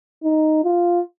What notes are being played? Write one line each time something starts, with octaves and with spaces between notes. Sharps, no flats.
D#4
F4